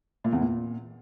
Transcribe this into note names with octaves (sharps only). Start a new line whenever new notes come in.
A#2
E2
A#2